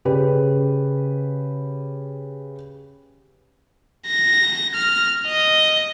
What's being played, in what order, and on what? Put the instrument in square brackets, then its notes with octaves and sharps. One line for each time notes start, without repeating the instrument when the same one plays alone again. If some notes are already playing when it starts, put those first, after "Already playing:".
[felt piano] C#3 G4 B4
[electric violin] A#6
F6
D#5